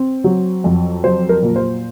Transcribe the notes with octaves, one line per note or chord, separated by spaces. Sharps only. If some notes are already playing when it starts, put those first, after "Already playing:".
Already playing: C4
F#3
F2
F#3 C5
A#4
A#2
C5